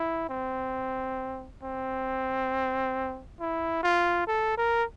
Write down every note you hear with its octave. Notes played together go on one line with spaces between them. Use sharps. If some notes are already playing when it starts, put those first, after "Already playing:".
Already playing: E4
C4
C4
E4
F4
A4
A#4